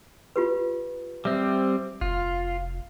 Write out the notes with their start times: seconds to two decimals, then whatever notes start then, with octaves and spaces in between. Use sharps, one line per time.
0.36 F4 G4 B4
1.25 G3 C4 E5
2.01 F1 F4